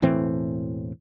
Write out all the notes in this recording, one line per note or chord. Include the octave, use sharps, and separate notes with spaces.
E1 A2 E3 C4